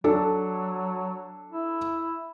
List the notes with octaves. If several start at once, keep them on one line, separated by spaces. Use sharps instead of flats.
F#3 D4 A4
E4